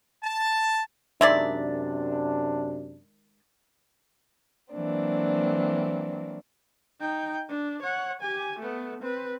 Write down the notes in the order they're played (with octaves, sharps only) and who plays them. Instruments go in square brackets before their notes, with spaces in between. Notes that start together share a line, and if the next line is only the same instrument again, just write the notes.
[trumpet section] A5
[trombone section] F#2 C3 D4 [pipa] D#3 G#3 D5 [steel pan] E5
[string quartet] E3 F#3 A#3 C4 D4
[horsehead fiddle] D#4 G5
D4
C#5 F#5
G4 G#5
A3 B3
C4 B4